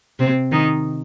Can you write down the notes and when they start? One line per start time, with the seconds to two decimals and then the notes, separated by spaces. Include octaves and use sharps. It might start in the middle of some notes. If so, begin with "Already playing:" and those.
0.19 C3 C4
0.52 D#3 D#4